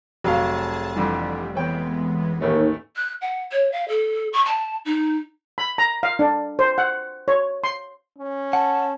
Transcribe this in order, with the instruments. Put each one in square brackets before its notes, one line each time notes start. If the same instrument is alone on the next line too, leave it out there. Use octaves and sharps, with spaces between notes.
[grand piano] F1 F5 [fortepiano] F#3 [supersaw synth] G#4 A5
[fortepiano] F2 D3 E3 [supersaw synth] G3
[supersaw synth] E3 G#3 B3 [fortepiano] B4 C#5 G5
[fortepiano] A1 A3 B3 [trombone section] D#2
[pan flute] F#6
F#5
C#5
F5
A4
C#6
A5
D#4
[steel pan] B5
A#5
F5
D4
C5
F#5
C#5
C6
[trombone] C#4
[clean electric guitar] F#5 [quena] A5